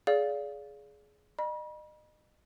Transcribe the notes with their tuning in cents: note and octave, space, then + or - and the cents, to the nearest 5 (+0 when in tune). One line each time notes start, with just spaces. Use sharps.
G#4 +15 D5 -30 F5 +0
D#5 -35 B5 -45